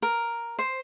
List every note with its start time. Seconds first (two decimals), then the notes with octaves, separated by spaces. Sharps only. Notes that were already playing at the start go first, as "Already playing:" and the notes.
0.02 A#4
0.59 C5